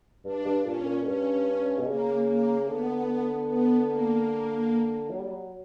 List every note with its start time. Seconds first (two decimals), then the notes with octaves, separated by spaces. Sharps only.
0.25 G2 D4
0.45 G2
0.65 A#2 C#4
0.86 A#2
1.02 A#2
1.06 G2 C#4
1.78 B2
1.86 C#3 A#3
2.27 A#3
2.67 D3 B3
3.48 B3
3.88 A#3
5.10 F#3
5.19 G3
5.29 F#3